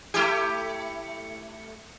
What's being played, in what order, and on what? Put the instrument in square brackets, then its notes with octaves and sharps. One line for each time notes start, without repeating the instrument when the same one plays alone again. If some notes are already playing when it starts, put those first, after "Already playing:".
[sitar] A3 E4 G4